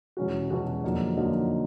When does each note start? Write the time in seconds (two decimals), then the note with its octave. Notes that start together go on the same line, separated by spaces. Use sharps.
0.17 E2 B2 G#3 C#4 F#4
0.50 E2 B2 G#3 C#4 F#4
0.84 F2 D3 F#3 A#3 D#4
1.17 F2 D3 F#3 A#3 D#4